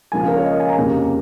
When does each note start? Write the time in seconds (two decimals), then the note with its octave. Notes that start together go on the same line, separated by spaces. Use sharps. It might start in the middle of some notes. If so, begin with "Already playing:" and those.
0.12 C#2 C#3 F3 A#3 G#5
0.21 F5
0.28 A#4
0.37 C#5
0.44 D#5
0.52 F5
0.60 G#5
0.69 A#5
0.77 F1 D#2 C#3 A#3